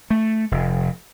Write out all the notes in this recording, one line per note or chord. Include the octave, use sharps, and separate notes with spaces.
A3
F1